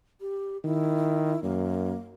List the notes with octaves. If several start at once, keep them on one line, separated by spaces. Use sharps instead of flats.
G4
D#3 E4
F#2 A#3